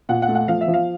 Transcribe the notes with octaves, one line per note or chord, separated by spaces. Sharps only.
A#2 F#5
F#5
A3
F#5
F3 F5
E5
F3
F5